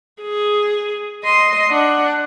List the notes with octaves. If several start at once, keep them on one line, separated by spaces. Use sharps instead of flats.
G#4
D#5 C6
D4 F#5